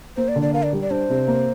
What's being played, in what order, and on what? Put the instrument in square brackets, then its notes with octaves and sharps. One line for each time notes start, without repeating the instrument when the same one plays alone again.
[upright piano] A#3 [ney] C5
[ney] D5
[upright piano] D3
[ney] D5
[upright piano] A#4 [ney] F5
[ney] D5
[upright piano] G3
[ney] D5
[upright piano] D4 [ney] C5
[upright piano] C3
A#3